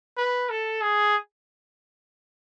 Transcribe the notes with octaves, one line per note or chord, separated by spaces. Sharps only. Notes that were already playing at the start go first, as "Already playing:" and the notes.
B4
A4
G#4